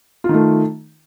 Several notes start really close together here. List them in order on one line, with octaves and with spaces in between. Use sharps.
F4 D#3 A3